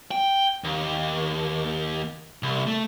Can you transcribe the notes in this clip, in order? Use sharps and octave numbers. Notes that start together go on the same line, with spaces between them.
G5
D#2
C2
A3